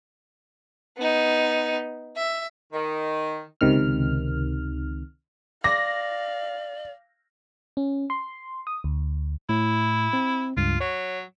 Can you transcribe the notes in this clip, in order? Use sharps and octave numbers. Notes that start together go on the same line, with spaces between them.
B3 D#4
E5
D#3
C#2 C3 D#3 F6
D5 F5 D6 A#6
C#4
C6
D#6
D2
A2 E4
C4
C#2 G2 F4
F#3 C#5